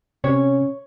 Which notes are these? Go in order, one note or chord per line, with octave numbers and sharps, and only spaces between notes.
C3 C#4 C#5